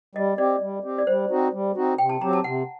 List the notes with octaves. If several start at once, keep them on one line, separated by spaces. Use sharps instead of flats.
G3 D#5
C4 G4 D5
G3
C4 G4
D5
G3 C5
C4 D#4 F#4
G3
C4 D#4 F#4
C3 G5
A5
F#3 C4 G4 A#5
A5
C3 F#5